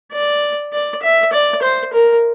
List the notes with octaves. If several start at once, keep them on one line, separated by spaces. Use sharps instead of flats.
D5
D5
E5
D5
C5
A#4